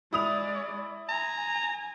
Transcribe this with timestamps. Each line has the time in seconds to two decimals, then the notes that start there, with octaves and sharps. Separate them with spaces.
0.13 G#3 E4 D5 D#6 F7
1.09 G#5 A#5